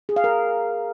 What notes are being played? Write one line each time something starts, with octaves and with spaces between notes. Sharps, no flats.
G#4
F5
A#4